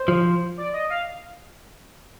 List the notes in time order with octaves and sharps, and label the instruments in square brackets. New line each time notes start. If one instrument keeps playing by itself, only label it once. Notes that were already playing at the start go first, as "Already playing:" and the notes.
Already playing: [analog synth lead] C5
[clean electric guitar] F3
[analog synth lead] D5
D#5
F5